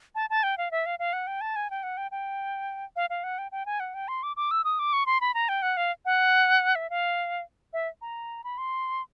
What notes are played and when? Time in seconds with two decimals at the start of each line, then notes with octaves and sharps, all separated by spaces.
0.15 A5
0.30 A5
0.43 G5
0.58 F5
0.71 E5
0.86 F5
0.99 F5
1.13 F#5
1.27 G5
1.41 A5
1.56 G#5
1.70 G5
1.83 F#5
1.97 G5
2.11 G5
2.96 F5
3.10 F5
3.24 F#5
3.38 G5
3.52 G5
3.66 G#5
3.80 F#5
3.94 G5
4.08 C6
4.23 D6
4.37 D6
4.51 E6
4.64 D#6
4.79 D6
4.93 C#6
5.06 C6
5.21 B5
5.34 A#5
5.49 G5
5.62 F#5
5.77 F5
6.05 F#5
6.75 E5
6.90 F5
7.73 E5
8.01 A#5
8.44 B5
8.58 C6